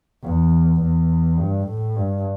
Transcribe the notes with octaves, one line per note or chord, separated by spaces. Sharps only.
E2
E2
G2
A2
G2